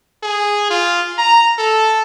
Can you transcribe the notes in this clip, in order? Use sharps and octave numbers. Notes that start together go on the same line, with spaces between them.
G#4
F4
A#5
A4